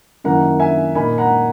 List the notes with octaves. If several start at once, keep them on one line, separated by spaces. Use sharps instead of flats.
F#2 D#3 A#3 E4 F#5 A#5
E5 G#5
A#2 A#3 D#4 G#5 B5
F#5 A#5